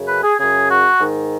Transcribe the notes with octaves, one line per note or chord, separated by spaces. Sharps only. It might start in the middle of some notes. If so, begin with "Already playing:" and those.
Already playing: F#2 C#3
B4
G#4
F#2 C#3 G#4
F#4
G#2 D#3